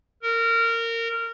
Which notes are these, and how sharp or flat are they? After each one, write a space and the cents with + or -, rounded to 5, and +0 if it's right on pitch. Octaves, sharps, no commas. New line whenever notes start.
A#4 -20